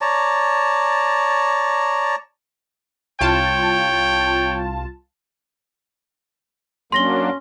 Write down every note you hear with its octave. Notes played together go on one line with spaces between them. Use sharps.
C#5 D5 A5 A#5
C2 F4 C#5 G5 A5
F#3 A#3 C#4 D4 C6 A#6 G7